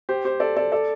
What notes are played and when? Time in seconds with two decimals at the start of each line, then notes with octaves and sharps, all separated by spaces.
0.09 G4 C5
0.25 G4 C5
0.40 A4 D5
0.57 A4 D5
0.72 A4 D5